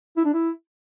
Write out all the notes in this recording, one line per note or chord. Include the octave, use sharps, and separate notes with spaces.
E4
D4
E4